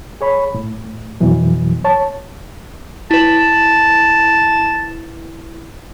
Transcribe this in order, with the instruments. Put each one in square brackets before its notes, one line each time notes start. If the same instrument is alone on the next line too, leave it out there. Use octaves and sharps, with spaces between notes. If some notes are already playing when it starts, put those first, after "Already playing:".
[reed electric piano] G#4 C#5 B5
A2
F2 B2 E3 F#3
C#5 A5
[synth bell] E4 B4 [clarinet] A5